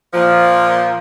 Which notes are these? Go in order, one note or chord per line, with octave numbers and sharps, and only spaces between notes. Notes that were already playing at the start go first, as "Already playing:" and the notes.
A#2 F3